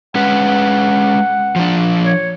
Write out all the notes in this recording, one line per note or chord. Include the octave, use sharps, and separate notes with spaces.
G#3 C#4 B4 F#5
F3 D4
C#5